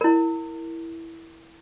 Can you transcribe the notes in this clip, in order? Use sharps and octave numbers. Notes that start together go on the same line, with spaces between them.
E4 A#4